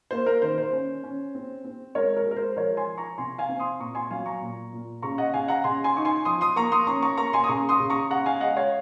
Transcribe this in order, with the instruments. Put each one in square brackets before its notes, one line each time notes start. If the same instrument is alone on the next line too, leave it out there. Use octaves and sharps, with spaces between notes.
[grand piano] A#3 C5
A#4
D#3 C5
C5
C#4
C#4
C4
C4
G#3 A#4 C#5
A#4
G#3
A#4
C5
F3 A#4 C#5
G#5 C6
F3
A#5 C#6
C3 G#5 C6
F5 G#5
C4
C6 D#6
A#2 A#5 C#6
G#5 C6
F#3 F5 G#5
A#5 C#6
A#2
A#2
C#3 A#5 C#6
D#5 F#5
C#3 F5 G#5
F#5 A#5
C#3 G#5 C6
G#5 C6
D#4 C#6
G#5 C6
F3 C6 D#6
C6 D#6
A#3 A#5 C#6
C6 D#6
C#4 A#5 C#6
A#5 C#6
A#3 A#5 C#6
G#5 C6
D#6
C#3 A#5 C#6
C6 D#6
C#3
A#5 C#6
C#3 F#5 A#5
F5 G#5
G#3 D#5 F#5
C#5 F5